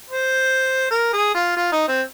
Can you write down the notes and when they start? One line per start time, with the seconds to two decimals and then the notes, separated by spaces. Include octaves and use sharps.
0.10 C5
0.91 A#4
1.13 G#4
1.34 F4
1.57 F4
1.72 D#4
1.88 C4